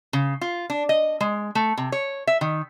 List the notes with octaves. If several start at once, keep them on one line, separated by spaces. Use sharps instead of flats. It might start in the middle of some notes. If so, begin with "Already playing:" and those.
C#3
F4
D4
D#5
G#3
A3
C3
C#5
E5
D#3